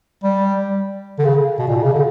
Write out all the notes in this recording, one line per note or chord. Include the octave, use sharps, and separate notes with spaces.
G3
D3
C#3
B2
A#2
B2
C#3
D3